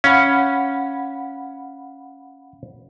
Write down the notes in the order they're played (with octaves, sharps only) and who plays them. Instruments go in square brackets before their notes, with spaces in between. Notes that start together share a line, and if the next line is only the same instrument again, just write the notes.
[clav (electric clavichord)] C#4 [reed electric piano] F5 F#5 B5